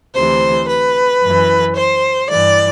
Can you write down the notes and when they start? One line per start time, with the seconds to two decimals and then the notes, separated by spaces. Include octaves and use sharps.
0.15 D2 C3 E3 C5
0.68 B4
1.23 F#2 E3
1.77 C5
2.30 G2 E3 D5